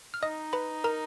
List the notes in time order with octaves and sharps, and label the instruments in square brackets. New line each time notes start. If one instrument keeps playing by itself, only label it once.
[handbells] F6
[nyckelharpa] D#4 [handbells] D#5 D#6
[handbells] B4 B5
A#4 A#5